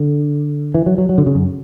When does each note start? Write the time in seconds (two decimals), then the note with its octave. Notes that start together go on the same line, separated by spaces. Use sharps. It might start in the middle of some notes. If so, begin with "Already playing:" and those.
Already playing: D3
0.74 E3
0.86 F#3
0.98 F#3
1.09 F#3
1.18 D3
1.26 C#3
1.35 F#2